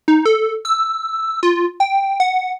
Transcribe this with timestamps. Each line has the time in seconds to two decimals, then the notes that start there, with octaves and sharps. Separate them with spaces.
0.08 D#4
0.25 A4
0.65 E6
1.43 F4
1.80 G5
2.20 F#5